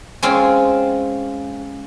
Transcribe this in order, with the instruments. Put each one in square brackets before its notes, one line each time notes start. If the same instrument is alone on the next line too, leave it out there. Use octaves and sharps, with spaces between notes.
[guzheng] G#3 C4 C#4 F4